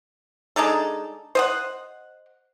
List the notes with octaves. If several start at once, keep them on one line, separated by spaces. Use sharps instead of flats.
G#3 D4 D#4 A4
C5 D#5 F#5